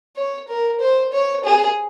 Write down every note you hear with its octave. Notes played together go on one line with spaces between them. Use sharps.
C#5
A#4
C5
C#5
G#4